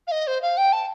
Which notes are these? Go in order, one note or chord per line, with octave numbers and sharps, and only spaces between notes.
F5
D#5
C5
F5
G5
A5